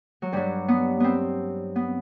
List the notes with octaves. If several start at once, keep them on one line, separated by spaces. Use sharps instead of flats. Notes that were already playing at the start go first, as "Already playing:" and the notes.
F#3
G2 F#3 G3
B3
B3 C4
B3